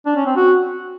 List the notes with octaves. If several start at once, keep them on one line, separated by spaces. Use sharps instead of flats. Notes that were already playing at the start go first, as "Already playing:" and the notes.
D4
C#4
C4
F#4